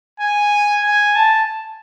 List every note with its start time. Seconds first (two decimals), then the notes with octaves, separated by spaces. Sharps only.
0.20 G#5
0.84 G#5
1.15 A5